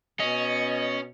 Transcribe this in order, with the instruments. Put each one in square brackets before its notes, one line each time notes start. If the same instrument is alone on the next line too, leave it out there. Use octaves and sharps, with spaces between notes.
[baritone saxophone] B2 [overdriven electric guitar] C#4 [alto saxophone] D#5